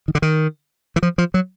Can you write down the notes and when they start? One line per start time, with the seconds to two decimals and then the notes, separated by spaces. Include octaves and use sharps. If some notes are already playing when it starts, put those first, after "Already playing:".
0.08 D#3
0.15 D3
0.22 D#3
0.96 E3
1.03 F3
1.18 F3
1.34 F#3